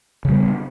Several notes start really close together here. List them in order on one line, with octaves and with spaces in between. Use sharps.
C#3 G3 B3